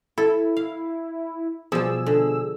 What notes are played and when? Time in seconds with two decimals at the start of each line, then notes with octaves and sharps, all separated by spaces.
0.18 E4 A4
0.57 F5
1.72 B2 F3 G3 G#4 E6
2.06 D3